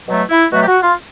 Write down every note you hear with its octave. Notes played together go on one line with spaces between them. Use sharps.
B2 F#3 A3
E4
B2 F#3 A3 F#4
G4
F#4
F4